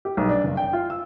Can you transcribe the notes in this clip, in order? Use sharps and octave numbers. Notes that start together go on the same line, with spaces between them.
G4
B1
D4
F#1
G5
F4
E6